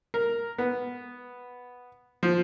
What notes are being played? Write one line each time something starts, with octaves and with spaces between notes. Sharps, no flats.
A#4
B3
F3